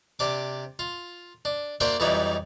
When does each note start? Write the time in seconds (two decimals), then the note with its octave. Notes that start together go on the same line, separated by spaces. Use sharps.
0.19 C3 D4 D6
0.79 F4
1.45 D4
1.80 A#3 D4 F#4 C5 D5 E5
2.00 F2 E3 F#3 G3 D#4 E4